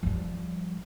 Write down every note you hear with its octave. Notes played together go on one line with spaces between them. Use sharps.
F3 G3